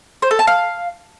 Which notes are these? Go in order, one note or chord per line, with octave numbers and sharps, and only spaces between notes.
C5
A4
A5
F5